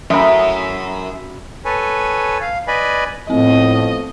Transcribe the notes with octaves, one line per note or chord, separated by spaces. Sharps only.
F#2 E5 B5
A4 B4 C#5 G#5
F5
B4 D5 D#5 G#5 B5
A2 F3 A3 B3 C4 D#5